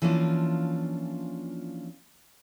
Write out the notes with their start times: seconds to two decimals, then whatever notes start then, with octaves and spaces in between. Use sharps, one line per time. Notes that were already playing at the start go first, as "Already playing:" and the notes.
0.02 E3 F3 A#3 C#4 D4 F4